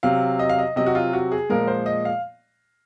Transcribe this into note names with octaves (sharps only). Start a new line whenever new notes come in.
C3 F#3 F5
D#5
F5
D#5
C3 F#3 D#5
F#4
F4
F#4
G#4
A#2 F3 G#3 A#4
C5
D#5
F5